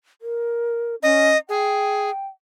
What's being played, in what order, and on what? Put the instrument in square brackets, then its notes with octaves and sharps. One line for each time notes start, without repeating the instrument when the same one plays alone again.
[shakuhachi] A#4
[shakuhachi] C#4 [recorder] D#5
[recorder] G#4 [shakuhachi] G5